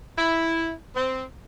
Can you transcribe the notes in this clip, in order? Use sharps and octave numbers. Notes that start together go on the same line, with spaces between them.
E4
C4